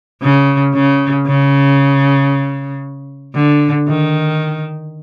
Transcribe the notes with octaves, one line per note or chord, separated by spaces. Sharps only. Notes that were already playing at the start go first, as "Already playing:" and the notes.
C#3
C#3
C#3
D3
D#3